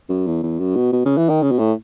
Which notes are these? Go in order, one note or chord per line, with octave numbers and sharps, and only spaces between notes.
F#2
E2
E2
F#2
B2
B2
C#3
E3
D#3
C#3
B2
A2